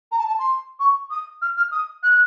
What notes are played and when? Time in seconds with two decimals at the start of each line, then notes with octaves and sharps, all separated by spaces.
0.12 A#5
0.18 A5
0.28 A5
0.39 C6
0.80 C#6
1.10 D#6
1.42 F6
1.57 F6
1.72 D#6
2.03 F#6